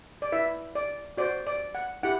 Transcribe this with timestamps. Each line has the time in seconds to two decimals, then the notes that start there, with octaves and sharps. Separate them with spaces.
0.22 D5
0.32 E4 B4 E5
0.75 D5
1.17 F#4 C5 D5
1.47 D5
1.75 F#5
2.03 E4 G4 F#5